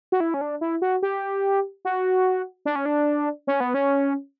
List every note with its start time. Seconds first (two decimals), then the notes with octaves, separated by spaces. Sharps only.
0.12 F#4
0.20 E4
0.34 C#4
0.41 D4
0.61 E4
0.82 F#4
1.03 G4
1.85 F#4
2.65 D4
2.76 C#4
2.86 D4
3.47 C#4
3.60 B3
3.74 C#4